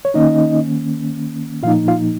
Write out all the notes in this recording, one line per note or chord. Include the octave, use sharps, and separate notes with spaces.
C#5
D#3 A#3 C#4 D#4 D#5
A#2 F3 A#3 D#4 F4 F5
F4 F5